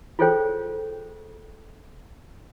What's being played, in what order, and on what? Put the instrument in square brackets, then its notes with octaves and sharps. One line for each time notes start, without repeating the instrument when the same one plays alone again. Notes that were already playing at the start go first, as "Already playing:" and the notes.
[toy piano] F4 G#4 A4 C5 C#5 G5